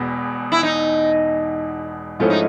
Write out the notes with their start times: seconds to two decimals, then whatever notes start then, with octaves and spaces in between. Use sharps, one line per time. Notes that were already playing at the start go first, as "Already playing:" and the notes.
Already playing: E1 E2 B2 B3
0.52 E4
0.63 D#4
2.19 G#2 F3 A3 C#4 E4 F4
2.30 D#4